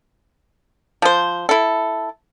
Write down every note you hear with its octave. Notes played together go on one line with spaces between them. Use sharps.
F3 C5
E4 A4